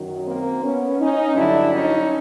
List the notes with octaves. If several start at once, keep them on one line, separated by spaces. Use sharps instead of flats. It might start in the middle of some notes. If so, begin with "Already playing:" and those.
Already playing: F#2 D#3 F#3
A#3 C4
B3 C#4
C#4 D#4
G2 D3 F#3 D4 E4
C#4 D#4